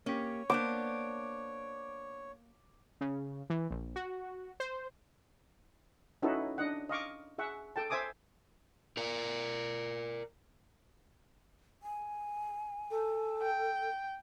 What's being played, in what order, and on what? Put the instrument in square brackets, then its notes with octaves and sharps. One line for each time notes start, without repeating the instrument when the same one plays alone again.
[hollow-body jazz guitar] A#3 G4 [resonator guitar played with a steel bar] C#4 [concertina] C#5
[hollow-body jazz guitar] A#3 [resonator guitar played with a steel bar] B3 D4 C5 [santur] D6
[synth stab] C#3
E3
A#1
F#4
C5
[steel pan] C#4 D#4 E4 F#4 A4 B4
D4 D#5 F#5
D#5 F5 C#6 D6
G#4 E5 F#5 C#6
A4 G5 A5
C5 E5 G#5 D6 D#6
[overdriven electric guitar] A#4 D5
[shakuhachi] G#5
[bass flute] A4
[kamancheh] G5